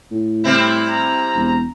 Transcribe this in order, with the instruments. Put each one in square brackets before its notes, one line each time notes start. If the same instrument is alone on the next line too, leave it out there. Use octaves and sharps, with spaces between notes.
[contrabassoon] A2
[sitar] G3 C4 E4
[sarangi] A#5
[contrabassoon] E1